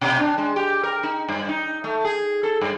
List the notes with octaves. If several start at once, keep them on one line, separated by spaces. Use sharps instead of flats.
B2
D4
G#3
G4
A#4
D#4
G2
D#4
A3
G#4
A4
G2